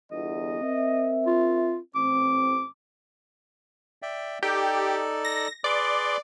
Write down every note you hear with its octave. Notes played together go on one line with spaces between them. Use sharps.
G1 E2 D#5
C4 A#4 E5
F4
A1 C4 D6
D5 E5 G5
D#4 G4 A4 D5
A#6
G#4 B4 D5 C6